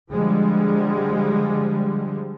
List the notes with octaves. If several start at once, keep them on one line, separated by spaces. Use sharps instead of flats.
D3 F3 G3 G#3